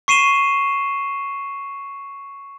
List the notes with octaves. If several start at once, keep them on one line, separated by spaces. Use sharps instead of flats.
C#6 C7 D#7 E7 G7